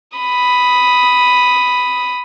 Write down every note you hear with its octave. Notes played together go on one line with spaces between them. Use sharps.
B5 D#6